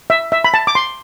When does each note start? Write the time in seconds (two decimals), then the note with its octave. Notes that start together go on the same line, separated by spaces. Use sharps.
0.10 E5
0.32 E5
0.44 B5
0.54 A5
0.67 D6
0.75 C6